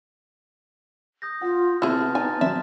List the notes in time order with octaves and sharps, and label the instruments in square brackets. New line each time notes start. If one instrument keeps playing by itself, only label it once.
[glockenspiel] D#6 G6 A#6
[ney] F4 [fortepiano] F#5
[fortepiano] C3 [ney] B3 [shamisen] E4 G#4 [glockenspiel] A5 F6 A6
[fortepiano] D#4 [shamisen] G#5 [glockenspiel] A#5 C6 A6
[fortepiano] F#3 [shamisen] E5